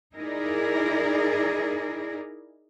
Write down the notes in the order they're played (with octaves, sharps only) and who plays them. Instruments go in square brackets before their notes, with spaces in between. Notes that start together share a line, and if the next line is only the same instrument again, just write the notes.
[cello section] D#4 E4 G#4 A#4 D5